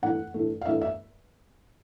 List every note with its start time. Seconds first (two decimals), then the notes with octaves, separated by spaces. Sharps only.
0.02 G2 E3 A3 F#5
0.34 G2 E3 A3
0.61 F5
0.66 G2 E3 A3 E5
0.82 E5